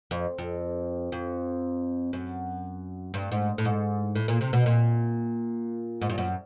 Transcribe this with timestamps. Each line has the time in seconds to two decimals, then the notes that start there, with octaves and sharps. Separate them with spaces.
0.11 F2
0.38 F2
1.12 F2
2.13 F#2
3.14 G2
3.32 G#2
3.58 A2
3.65 G#2
4.15 A2
4.28 A#2
4.41 C3
4.53 B2
4.66 A#2
6.01 G#2
6.10 G2
6.18 F#2